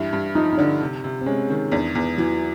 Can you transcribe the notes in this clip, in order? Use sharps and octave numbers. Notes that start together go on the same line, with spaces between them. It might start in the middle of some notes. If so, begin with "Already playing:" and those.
Already playing: G2 E3 E4
G2
F3 D#4
D#4
D3 D4
C3
C3
C4
G#3 C#4
D#3
E2 D4
E2 B3
E3 F#3